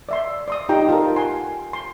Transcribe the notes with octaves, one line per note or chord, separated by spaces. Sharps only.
D5 E5 C6
D5 C6 D#6
D#4 F4 G4 G5 A#5
F4 A4 A#4
F#5 G#5 C6
C6